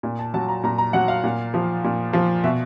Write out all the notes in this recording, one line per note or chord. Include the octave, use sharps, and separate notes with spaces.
A#2
A5
F#3 A5
A#5
A#2 A#5
A#5
F#3 F#5
F5
A#2
F3
A#2
F3
B2 E5